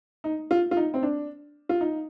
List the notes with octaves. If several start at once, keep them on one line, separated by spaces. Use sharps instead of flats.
D#4
F4
F4
D#4
C4
D4
F4
D#4